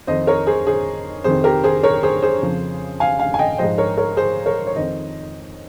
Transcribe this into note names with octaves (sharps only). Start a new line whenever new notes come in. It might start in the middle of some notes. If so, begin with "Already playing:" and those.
F2 D#3 C5 D#5
A#4 C#5
G#4 C5
G#4 C5
F2 C3 D#3 G#4 C5
G4 A#4
G#4 C5
A#4 C#5
G#4 C5
G#4 C5
F2 C#3 F3
F5 G#5
F5 G#5
G#5
D#5 G5
G#2 F3 C5 D#5
A#4 C#5
A#4 C#5
G#4 C5
A#4 C#5
C#5
F2 D#3 C5 D#5